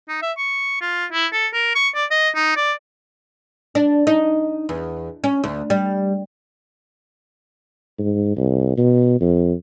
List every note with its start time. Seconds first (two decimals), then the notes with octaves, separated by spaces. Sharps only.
0.08 D#4
0.22 E5
0.38 C#6
0.81 F4
1.12 E4
1.33 A4
1.53 A#4
1.75 C#6
1.95 D5
2.11 D#5
2.35 D#4
2.56 D5
3.75 D4
4.07 D#4
4.69 E2
5.24 C#4
5.44 D2
5.70 G3
7.99 G#2
8.36 C2
8.78 B2
9.21 F2